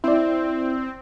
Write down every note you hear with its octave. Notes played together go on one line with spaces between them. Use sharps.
C4 E4 D5